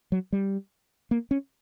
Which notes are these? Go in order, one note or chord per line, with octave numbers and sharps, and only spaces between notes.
F#3
G3
A#3
C#4